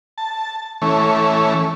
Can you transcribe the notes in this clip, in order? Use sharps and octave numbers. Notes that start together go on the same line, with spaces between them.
A5
E3 A3 C#4